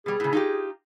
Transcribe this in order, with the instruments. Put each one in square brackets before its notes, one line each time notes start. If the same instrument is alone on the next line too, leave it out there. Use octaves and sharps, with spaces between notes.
[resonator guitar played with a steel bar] B2 G3 [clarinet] G#4
[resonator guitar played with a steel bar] A2 C#3
D#4 F4 G4